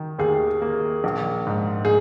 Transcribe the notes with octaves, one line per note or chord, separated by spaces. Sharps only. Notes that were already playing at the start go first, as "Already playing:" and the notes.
Already playing: D#3
D#2 G#4
A#3
A#1
G#2
G#4